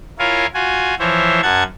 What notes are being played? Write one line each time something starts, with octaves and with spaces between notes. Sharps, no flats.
E4 F4 A#4 C#5 F5 G#5
F4 F#4 G#5
E3 F3 C5 C#5 E5
F#2 F#5 A5 G#6